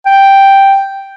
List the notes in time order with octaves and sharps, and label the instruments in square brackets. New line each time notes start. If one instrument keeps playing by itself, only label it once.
[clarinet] G5